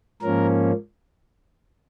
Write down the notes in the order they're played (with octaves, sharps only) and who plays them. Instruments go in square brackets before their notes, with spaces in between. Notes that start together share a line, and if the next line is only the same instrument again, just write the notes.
[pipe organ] G#2 F3 A#3 C#4 A#4